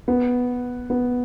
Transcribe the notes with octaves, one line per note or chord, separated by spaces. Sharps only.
B3
B3